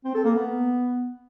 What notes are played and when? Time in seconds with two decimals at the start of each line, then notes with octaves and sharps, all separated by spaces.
0.05 C4
0.15 A4
0.25 A#3
0.35 B3